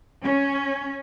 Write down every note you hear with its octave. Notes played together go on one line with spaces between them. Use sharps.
C#4